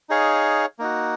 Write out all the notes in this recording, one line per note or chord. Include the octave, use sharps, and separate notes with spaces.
D#4 G#4 C#5 F5
A#3 D#4 F#4